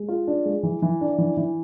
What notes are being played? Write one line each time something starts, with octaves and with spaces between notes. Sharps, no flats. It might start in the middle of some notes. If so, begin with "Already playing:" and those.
Already playing: G#3
F4
D4
G#3
E3
E3
D4
E3
E3